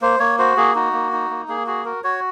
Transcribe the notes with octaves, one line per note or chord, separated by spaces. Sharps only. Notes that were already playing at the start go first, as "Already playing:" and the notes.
A#3 C5
A#3 C#5
F#4 C5
A#3 G#4
D#4 F#4
A#3
D#4
A#3
A#3 G#4
F#4 G#4
F#4 A#4
F#4 C#5